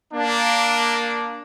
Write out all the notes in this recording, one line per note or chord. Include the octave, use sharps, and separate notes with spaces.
A#3 D4